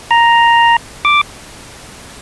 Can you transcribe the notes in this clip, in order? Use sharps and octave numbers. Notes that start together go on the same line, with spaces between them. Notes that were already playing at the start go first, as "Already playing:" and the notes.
A#5
D6